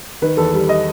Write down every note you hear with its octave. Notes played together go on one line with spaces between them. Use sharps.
D#3 B4
E2 A4
G3
D#5